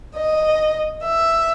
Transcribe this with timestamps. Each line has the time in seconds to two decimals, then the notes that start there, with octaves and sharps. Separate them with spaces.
0.16 D#5
1.03 E5